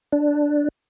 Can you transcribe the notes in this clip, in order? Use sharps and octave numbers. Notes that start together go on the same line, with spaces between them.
D4